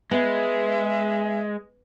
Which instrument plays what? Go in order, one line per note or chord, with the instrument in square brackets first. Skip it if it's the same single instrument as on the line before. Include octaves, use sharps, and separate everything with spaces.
[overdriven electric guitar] G#3 [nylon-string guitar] B3 [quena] E5